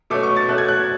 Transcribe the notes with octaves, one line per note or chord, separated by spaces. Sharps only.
B2 A3 C#4 D6
C#6
A6
B2 A3 C#4 F#6
G#6
F#6